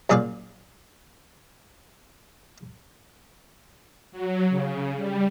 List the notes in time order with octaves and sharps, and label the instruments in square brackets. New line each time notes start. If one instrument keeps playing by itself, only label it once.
[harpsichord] F#2 A#2 G#4 D5 F5
[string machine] F#3
C#3
G3